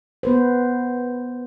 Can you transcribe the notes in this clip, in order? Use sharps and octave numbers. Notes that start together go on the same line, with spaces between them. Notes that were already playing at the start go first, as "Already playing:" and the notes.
B3 B4 C5